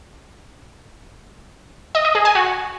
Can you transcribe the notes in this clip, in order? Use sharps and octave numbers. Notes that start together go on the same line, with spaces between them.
D#5
D#5
G#4
G#5
F#4